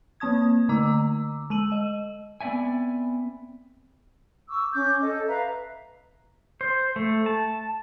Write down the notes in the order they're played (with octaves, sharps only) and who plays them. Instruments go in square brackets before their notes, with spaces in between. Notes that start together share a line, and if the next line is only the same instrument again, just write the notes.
[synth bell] A#3 C4 A5 D#6 G#6
D3 A3 A#5 D6 E6
G#3 E6 D#7 F#7
D#5
[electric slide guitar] B3 C4 D5 E5 G#5
[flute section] C#6 D6 E6
C#4 D6 G6
A4 D#5
B4 E5 F5 A#5
[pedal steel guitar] C5
A3
A5